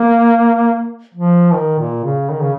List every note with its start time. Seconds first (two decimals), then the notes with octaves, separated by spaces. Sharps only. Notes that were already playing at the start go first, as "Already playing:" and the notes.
Already playing: A#3
1.15 F3
1.53 D#3
1.79 A#2
2.04 C#3
2.30 D#3
2.41 C#3